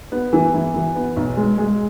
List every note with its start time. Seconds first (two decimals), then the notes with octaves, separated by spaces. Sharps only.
0.12 B3
0.33 E3
0.54 E3
0.74 E3
0.95 B3
1.16 B1
1.37 G#3
1.58 G#3